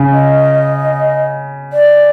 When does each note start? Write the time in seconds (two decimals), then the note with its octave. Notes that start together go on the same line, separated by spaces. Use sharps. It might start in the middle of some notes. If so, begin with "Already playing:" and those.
Already playing: C#3
0.13 D#5
1.73 D5